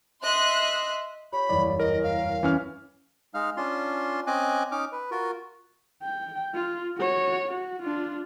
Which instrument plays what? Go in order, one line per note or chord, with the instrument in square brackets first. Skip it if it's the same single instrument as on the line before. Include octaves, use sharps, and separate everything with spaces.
[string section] D#5 E5 C6 F#6
[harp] F4 G4 C#5 [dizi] B5
[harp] F#1 E2 G2 [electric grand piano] D5
[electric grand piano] A#4 [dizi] D#5
[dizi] F5
[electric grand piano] E3 C#4 F6
[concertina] G#3 D#4 F5 F6
C#4 D4 F4 C6
C4 C#4 D#5 G#5 D6 F#6
C#4 D#4 D6 F6
B4
F4 F#4 A#4
[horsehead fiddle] G5
F4
F#4 C#5
F#4
D4 F4